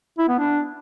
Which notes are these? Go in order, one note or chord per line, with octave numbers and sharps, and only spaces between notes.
E4
B3
D4